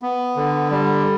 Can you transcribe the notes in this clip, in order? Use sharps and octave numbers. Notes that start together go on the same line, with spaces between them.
B3
D3
G3